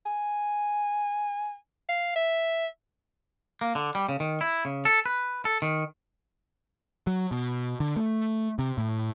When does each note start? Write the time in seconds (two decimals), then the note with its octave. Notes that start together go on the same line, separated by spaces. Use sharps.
0.06 G#5
1.89 F5
2.16 E5
3.61 A#3
3.75 D3
3.95 G3
4.09 C#3
4.20 D#3
4.41 E4
4.65 C#3
4.85 A4
5.06 B4
5.45 A4
5.62 D#3
7.07 F#3
7.31 B2
7.80 D3
7.96 A3
8.59 C3
8.78 A2